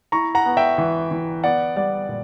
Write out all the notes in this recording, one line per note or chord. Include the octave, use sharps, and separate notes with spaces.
E4 A#5 C#6
F#5 A#5
B3
E5 G5
E3
E3
B3 D5 F#5
G3 D5 F#5
A#2